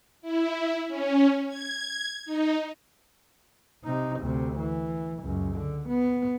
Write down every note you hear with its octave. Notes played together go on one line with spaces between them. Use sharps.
E4
C#4
G#6
D#4
C3 D#4
D2 C3
E3
C#2 F#2
D3
B3